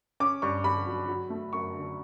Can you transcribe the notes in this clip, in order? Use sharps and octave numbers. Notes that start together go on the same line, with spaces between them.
C#4 D6
G2 C#6
G2 B5
F#3
F#3
A3
F#2 C#6
D3